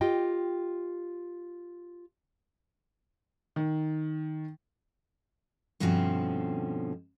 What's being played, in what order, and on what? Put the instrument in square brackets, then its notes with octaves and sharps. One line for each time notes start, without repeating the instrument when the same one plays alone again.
[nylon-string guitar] F4 G4 D#5 G5
[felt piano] D#3
[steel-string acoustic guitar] G2 B2 D3 F3 C4 C#4